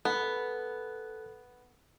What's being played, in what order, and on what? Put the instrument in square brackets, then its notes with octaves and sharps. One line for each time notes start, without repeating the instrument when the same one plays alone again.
[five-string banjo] B3 [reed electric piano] A4 F#6